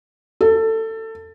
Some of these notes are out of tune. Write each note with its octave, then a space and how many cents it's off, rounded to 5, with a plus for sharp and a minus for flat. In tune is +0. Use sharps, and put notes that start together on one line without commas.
A4 +20